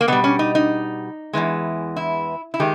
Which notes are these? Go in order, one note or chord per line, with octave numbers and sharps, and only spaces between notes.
A#3
B2 G3 B3
C#4
D#4
D#4
E2 C#3 E3 G#3
E4
E4
D#3 G#3 G4